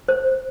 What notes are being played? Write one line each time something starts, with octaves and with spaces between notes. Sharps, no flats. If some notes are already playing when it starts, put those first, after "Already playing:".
C5